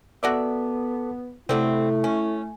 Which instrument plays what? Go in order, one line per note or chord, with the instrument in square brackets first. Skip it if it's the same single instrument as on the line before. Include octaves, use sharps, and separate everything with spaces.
[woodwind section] B3 [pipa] F#4 D5 E5 [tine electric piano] A4 A5 D6
[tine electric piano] C3 A4 [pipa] F#3 G3 C4 [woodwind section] A3 [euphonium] E4
[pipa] C#4 [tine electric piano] G#5